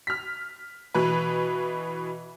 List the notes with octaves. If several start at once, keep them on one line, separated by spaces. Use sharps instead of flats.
F6 B6
B2 E3 B4